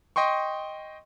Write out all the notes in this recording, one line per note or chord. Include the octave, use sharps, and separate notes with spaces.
D#5 G5 C6 C#6